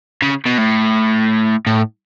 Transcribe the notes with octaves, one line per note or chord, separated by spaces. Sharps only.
C#3
B2
A2
A2